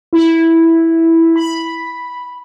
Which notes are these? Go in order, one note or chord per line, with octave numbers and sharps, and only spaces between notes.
E4
B5